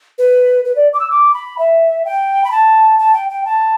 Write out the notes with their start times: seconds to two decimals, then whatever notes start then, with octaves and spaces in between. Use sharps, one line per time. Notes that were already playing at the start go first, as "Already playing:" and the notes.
0.18 B4
0.65 B4
0.76 D5
0.93 D6
1.00 E6
1.11 D6
1.34 B5
1.59 E5
2.05 G5
2.44 B5
2.51 A5
2.99 A5
3.13 G5
3.30 G5
3.45 A5